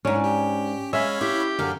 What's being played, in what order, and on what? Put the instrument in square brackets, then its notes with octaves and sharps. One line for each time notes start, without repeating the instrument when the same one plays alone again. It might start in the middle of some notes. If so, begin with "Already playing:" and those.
[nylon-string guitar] G#2 D4 [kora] C#4
[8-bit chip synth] G4
[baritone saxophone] G#3 [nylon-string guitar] C#4 [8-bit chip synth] C#5 F5 B5 [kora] E5
[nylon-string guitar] E4 [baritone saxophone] G4
[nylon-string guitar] F#2 F5 [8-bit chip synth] D3